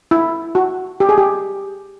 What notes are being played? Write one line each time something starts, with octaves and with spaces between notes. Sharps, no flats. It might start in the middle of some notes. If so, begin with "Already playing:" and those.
E4
F#4
G4
G#4
G4